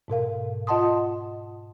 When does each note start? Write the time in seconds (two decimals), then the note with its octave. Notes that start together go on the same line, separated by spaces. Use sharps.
0.08 G#2 B2 A#4 F5
0.67 F4 D#5 F#5 A5 C6 D#6